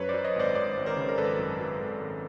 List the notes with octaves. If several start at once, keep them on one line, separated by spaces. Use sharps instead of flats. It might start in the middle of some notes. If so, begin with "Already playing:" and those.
Already playing: F#2 B4 C#5
F#3 C5 D5
C#5 D#5
G#1 C5 D5
G#1 C5 D5
G#1
A#4 C5
C#3
A#4
G#1 A4 B4
F#2
F#3
G#1
G#1